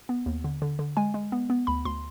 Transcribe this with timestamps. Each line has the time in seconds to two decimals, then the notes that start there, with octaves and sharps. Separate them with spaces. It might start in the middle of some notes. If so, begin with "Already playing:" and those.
0.09 B3
0.26 D#2
0.44 D3
0.62 D3
0.79 D3
0.97 G#3 G#5
1.14 G#3
1.32 B3
1.50 B3
1.67 D2 B5
1.85 D2 C6